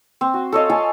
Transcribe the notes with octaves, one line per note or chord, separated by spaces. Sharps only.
C4
F#4
A4 C#5 D#5 F5
F4 A4 G#5